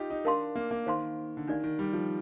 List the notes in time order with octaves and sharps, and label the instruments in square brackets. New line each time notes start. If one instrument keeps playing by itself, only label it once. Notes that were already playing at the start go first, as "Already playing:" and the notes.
Already playing: [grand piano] D#4 F4 G4
D#4
[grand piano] D4 [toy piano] A#4 F5 A5 C6
[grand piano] A#3
A#3
[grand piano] D#3 [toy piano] C5 F5 A5 C6
[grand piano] D3
[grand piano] D#3 [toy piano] D4 G4 A#4 D5 F5
[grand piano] D#3
G3
F3